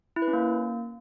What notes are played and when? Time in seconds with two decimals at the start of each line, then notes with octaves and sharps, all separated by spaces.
0.16 E4
0.22 B4
0.28 C#4
0.33 A#3